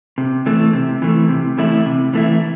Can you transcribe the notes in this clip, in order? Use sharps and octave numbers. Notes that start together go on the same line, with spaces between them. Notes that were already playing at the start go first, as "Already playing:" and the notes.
C3
E3 A3
C3
E3 A3
C3
E3 A3 E4
C3
E3 A3 E4